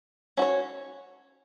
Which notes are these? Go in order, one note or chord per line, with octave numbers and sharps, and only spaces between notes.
C#4 F#4 C#5